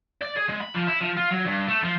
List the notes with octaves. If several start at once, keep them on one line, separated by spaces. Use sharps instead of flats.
D5
G#4
G#3
B5
F3
E4
F3
F4
F#3
G2
A3
F3